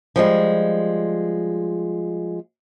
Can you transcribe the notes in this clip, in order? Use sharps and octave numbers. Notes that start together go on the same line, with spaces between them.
F3 G3 G#3